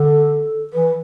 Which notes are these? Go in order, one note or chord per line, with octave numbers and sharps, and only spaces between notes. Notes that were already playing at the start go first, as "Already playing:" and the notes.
Already playing: D3 A4
E3 B4